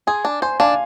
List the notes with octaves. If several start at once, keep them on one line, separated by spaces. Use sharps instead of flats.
G#4 G#5 C6
D4
C5 G#5 C6
D4 F5 G#5